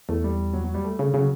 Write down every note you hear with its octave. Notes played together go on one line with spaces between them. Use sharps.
E2 A3
G3
F#3
F#3
G3
A3
C#3
C#3 F#3